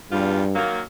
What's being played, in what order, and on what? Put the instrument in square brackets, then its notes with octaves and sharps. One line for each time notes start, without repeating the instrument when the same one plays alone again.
[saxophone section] E2 G3 F4 [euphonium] G2
[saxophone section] D#3 F#3 A#3